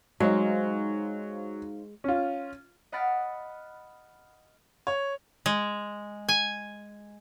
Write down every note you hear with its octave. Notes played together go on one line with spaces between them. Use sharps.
F#3 G#3 D#4 C5 F5
C#4 F4
D#5 F#5 B5 F6 A6 D7
C#5
G#3
G#5